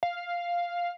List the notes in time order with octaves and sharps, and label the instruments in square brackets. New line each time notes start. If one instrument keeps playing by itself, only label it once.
[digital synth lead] F5